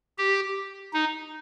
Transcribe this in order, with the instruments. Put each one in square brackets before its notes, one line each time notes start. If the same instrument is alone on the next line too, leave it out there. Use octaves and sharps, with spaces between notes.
[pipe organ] G4
D#4